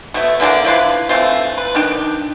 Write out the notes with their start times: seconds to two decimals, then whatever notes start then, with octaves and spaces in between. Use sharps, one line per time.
0.14 B2 A3 E5
0.40 D3 E3 A#3 D4
0.64 F3 E4 F4 B4
1.09 E3 A3 C4 F4
1.58 B4
1.75 D#3 D4 G5